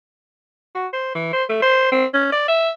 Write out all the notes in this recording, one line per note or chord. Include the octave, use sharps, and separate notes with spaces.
F#4
C5
E3
C5
A3
C5
C4
C#4
D5
E5